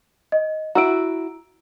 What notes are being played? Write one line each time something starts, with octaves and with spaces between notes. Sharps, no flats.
D#5
E4 F#4 A#5 E6 D7